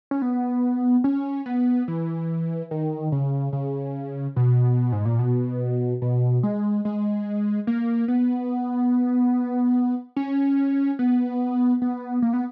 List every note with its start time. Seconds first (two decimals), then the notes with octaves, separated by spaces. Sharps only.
0.11 C#4
0.22 B3
1.04 C#4
1.46 B3
1.88 E3
2.71 D#3
3.12 C#3
3.53 C#3
4.36 B2
4.92 G#2
5.05 A#2
5.19 B2
6.02 B2
6.43 G#3
6.85 G#3
7.67 A#3
8.08 B3
10.16 C#4
10.99 B3
11.82 B3
12.22 A#3
12.33 B3